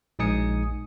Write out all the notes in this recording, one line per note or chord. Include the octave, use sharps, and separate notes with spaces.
A#1 G#3 D#4 G#5 D#6 C#7